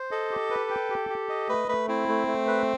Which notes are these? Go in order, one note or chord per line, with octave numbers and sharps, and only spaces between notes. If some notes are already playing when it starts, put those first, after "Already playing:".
Already playing: C5
A4 D#5
G4
B4
G5
G4
G4
D#5
A3 B4
A3 B4
C4 E4
A3
A3
B4